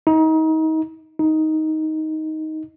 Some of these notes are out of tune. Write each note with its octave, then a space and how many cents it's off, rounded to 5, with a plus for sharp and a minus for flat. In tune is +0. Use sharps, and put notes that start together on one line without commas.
D#4 +30
D#4 +10